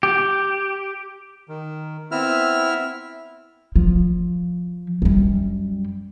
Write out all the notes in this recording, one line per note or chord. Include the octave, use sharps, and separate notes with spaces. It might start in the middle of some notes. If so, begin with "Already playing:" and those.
G4
D#3
B3 C4 E4 E5 F6
F3
F#2 G3